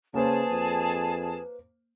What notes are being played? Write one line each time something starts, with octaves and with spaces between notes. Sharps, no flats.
C#3 A#3 G#4 B4 C5 A5
F2